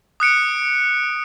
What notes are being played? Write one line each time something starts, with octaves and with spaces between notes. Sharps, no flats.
D#6 F#6 C#7 D7